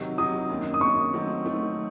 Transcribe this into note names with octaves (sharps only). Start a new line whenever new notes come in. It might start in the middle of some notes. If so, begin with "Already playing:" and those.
Already playing: C3 D#3 F#3
C3 D#3 F#3 D#6
F#2 D#3 A#3 C#4
D#6
F#2 D#3 A#3 C#4 C#6
D#3 F#3 A3 C4
D#3 F#3 A3 C4